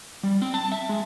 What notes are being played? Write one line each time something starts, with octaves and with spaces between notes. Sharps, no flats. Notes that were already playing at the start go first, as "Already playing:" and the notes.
G3
C4
A5
E5
G#3